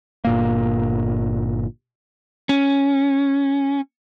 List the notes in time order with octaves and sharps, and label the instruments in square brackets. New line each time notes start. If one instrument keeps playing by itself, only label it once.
[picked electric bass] G1 A#2 A#3
[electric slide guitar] C#4